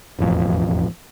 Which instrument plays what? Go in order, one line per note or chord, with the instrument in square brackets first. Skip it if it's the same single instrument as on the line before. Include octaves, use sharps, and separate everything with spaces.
[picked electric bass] E1 A1 F2